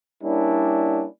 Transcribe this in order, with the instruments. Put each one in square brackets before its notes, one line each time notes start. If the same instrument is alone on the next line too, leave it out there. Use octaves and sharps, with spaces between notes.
[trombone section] G3 A#3 C#4 D4 E4